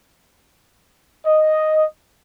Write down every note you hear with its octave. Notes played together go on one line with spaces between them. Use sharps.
D#5